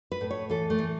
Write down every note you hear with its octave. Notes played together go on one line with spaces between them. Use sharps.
B4
A2
C#5
E3 A4
A3
E3